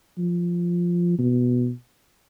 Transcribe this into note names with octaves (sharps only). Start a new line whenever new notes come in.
F3
B2